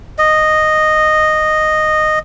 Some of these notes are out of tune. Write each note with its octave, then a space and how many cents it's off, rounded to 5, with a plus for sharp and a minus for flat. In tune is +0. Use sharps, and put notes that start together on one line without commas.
D#5 -10